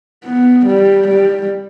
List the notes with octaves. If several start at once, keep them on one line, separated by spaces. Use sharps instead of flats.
B3
G3
G3